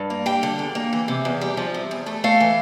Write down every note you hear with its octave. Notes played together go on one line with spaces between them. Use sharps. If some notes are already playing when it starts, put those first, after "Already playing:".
Already playing: G2
A#3
G3 G5
D3
E2
A#3
E3
C3
E2
G3
F3
C3
E2
A3
A3 F5
E3